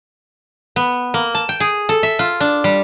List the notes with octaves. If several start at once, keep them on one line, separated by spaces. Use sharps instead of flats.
B3
A#3
A5
G5
G#4
A4
E5
F4
D4
G3